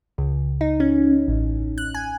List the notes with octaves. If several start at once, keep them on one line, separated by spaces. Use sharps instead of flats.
C#2
D#4
C#4
A1
F#6
G#5